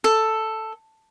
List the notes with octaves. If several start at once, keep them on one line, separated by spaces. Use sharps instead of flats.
A4